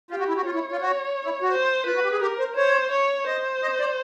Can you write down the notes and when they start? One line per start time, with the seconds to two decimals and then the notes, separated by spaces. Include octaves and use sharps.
0.11 F4 G4
0.19 F#4
0.28 E4
0.37 F#4
0.45 F4 C#5
0.54 E4
0.72 F4
0.81 F#4
1.25 E4
1.42 F#4
1.51 C5
1.86 F4 B4
1.95 F#4
2.04 G4
2.12 G#4
2.22 G4 A#4
2.39 C5
2.56 C5 C#5
2.91 C#5
3.26 C5 D#5
3.62 D#5
3.79 D5